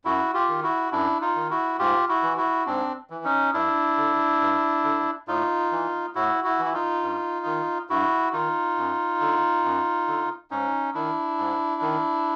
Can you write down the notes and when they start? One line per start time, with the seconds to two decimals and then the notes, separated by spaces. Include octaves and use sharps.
0.05 F#2 E4 F#4
0.34 F4 G4
0.49 D#3
0.63 E4 F#4
0.92 F#2 D4 E4
1.21 D#4 F4
1.35 D#3
1.50 E4 F#4
1.79 G#2 F4 G4
2.09 E4 F#4
2.23 E3
2.37 E4 F#4
2.66 G#2 C4 D4
3.10 E3
3.24 C#4 D#4
3.54 G2 D4 E4
3.97 D3
4.41 G2
4.84 D3
5.28 A2 D#4 F4
5.72 E3
6.15 A2 E4 F#4
6.44 E4 F#4
6.59 E3
6.65 E4
6.73 D#4 F4
7.02 G2
7.46 D#3
7.90 G2 E4 F#4
8.33 D#3 D#4 F4
8.77 F#2
9.20 D3
9.64 F#2
10.08 D3
10.51 G#2 C#4 D#4
10.95 D#3 D4 E4
11.38 G#2
11.82 D#3